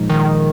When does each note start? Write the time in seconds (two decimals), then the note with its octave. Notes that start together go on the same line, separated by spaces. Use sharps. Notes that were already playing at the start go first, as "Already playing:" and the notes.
Already playing: A#2 F3 G#3 D#4
0.10 D#3